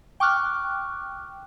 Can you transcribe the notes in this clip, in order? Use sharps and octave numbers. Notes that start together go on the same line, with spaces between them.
G5 C#6 D6 F6 F#6